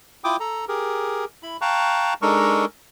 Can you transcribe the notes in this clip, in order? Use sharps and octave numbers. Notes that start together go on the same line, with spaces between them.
E4 F4 G5 D6 D#6
A4 A#5
G4 G#4 A#4
E4 B5
F5 G5 A5 A#5 C#6 F#6
G#3 D4 D#4 A4 A#4 C#6